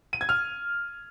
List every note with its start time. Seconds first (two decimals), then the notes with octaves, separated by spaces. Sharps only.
0.13 D#7
0.21 G#6
0.29 F6